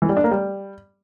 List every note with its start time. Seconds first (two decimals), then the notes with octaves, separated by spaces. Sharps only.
0.02 E3
0.09 G3
0.17 D4
0.24 A#3
0.31 G3